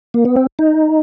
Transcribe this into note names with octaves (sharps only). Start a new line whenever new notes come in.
A#3
B3
C4
D#4